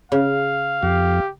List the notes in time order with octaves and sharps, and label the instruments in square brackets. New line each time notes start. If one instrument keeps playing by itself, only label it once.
[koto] C#3 [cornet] F5
[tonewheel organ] F2 [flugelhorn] G4